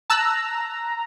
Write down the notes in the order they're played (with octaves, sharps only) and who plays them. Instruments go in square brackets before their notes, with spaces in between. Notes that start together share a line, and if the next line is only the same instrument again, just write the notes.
[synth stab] A5 E6 F#6 [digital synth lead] A#5